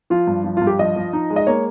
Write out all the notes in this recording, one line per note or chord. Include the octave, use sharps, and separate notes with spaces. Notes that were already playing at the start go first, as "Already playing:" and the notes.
F3 F4
G2
F3
G2 F4
G4
F3 D#5
F3
D#4
G#3
D#5
A#3 C#5